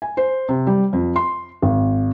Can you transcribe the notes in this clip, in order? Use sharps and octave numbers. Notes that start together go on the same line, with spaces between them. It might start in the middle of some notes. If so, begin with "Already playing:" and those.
G#5
C5
C3
G3
F2
C6
G#1